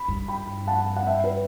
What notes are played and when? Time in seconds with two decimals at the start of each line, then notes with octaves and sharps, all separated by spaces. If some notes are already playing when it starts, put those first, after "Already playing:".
Already playing: B5
0.08 G2
0.28 G5 B5
0.67 F#5 A5
0.97 F#5
1.07 E5 G5
1.24 B4